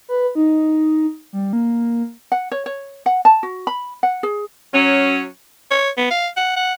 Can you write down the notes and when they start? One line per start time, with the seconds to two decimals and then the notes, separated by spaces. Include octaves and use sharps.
0.09 B4
0.35 D#4
1.33 G3
1.53 A#3
2.32 F#5
2.52 C#5
2.66 C#5
3.06 F#5
3.25 A5
3.43 F#4
3.67 B5
4.03 F#5
4.23 G#4
4.73 F#3 C#4
5.71 C#5
5.97 B3
6.11 F5
6.37 F#5
6.56 F#5